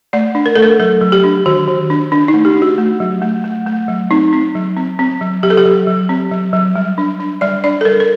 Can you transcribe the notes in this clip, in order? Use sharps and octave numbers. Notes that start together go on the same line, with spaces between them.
A3 D5
D4
A#4
A3 A4
A#4
F#3 A4
F#3
G4
D4
D#3 F#4
D#3
D4
D4
D#4
A3
G4
D4
F#4
A3
F#3
A3
A3
A3
F#3
C4 D#4
C4
F#3
C4
C4
F#3
F#3 G4
A4
G4
F#3
F#3
C4
F#3
F#3
G3
D4
D4
G3 D5
D4 D5
A4
G3 A#4
A#4